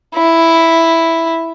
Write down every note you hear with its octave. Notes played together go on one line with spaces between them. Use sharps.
E4